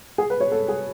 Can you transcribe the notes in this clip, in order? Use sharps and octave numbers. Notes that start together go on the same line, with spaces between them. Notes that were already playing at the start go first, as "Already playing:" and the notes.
G#4
B4
C#5
A4
G#4